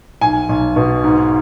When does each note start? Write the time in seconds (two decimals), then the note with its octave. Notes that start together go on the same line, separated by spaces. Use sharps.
0.21 B1 G#5
0.49 B1
0.76 B2
1.04 G#2